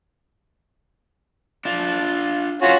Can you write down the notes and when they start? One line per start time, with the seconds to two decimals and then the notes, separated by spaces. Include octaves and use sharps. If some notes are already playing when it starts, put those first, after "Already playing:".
1.65 D4 F4
2.62 C#4 F4 F#4